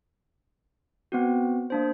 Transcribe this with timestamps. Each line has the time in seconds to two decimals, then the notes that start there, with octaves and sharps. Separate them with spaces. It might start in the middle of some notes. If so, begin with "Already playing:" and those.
1.12 B3 C4 F#4
1.70 A#3 D4 C5